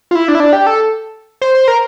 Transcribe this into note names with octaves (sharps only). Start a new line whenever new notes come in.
F4
E4
D4
E4
D4
G4
A4
C5
C5
A#4